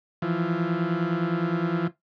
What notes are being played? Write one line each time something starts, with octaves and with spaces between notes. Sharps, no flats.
E3 F3